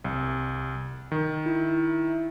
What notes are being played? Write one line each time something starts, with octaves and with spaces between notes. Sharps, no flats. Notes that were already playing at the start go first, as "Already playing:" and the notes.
C2
D#3
E4